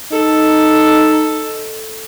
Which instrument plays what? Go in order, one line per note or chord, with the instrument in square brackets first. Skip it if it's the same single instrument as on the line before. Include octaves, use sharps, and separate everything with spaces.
[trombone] D#4 [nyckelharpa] A4